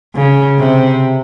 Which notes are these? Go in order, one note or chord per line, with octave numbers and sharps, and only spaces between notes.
C#3
C3